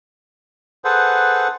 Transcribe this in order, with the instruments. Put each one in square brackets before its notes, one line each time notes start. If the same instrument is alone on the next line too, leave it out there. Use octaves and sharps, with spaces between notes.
[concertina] G#4 A4 B4 C5 F#5